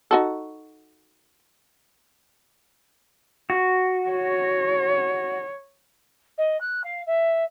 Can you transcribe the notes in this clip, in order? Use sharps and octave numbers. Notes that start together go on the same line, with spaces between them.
D#4 F#4 A4
F#4
C#5
D#5
F#6
F5
E5